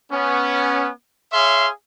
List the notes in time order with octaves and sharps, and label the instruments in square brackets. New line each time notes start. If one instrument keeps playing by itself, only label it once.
[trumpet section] B3 C#4
G#4 C#5 E5 F5 C6